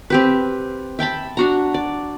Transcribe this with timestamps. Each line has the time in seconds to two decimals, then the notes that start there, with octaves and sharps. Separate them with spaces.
0.10 C4 G4 B4
0.99 E5 G5 A5 B5
1.37 D4 F#4 A#5
1.74 D5